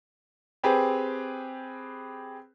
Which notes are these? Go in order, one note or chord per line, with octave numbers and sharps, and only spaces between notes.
C4 G4 G#4 B4